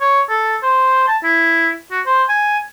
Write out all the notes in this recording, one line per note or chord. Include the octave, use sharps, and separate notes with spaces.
C#5
A4
C5
A5
E4
F#4
C5
G#5